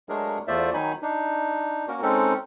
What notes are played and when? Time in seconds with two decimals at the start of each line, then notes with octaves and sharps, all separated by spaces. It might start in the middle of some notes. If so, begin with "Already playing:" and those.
0.09 F#3 G#3 A3 D4 G#4 A#4
0.48 E2 A3 F4 C5 D5 E5
0.74 D#3 F#3 D#4 G#5 B5
1.02 D4 D#4
1.88 A#3 C#4 F#4 A#4
2.02 G#3 C4 C#4 D#4 A4